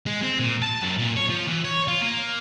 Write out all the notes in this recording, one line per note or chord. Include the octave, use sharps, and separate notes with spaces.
G#3
C4
A#2
A5
F#2
A#2
C#5
F3
E3
C#5
F4
A#3